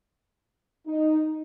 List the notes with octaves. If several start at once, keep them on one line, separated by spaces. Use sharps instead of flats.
D#4